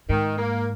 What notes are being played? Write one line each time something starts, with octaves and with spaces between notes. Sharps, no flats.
G#2 D#3
A#3